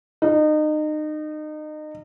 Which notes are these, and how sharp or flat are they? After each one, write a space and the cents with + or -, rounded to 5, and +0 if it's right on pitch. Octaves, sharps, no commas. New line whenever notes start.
D#4 -30